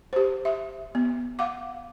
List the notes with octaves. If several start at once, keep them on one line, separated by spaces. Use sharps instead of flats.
G4 C5
E5
B3
F5 F#5 D6